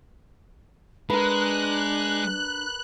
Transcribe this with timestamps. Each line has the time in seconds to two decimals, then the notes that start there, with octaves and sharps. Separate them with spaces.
1.10 G#3 D4 A#4 B4 F#6